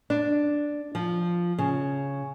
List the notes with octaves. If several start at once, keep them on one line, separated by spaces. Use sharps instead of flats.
D4
F3
C#3